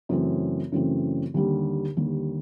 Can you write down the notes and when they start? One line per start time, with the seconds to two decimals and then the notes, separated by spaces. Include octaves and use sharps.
0.09 F#2 C#3 E3 A3 C4
0.72 F#2 C#3 E3 A3 C4
1.34 D#2 D3 G3
1.97 D#2 D3 G3